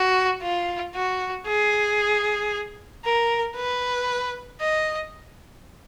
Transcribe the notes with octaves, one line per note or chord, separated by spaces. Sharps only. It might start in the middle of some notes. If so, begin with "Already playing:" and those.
Already playing: F#4
F4
F#4
G#4
A#4
B4
D#5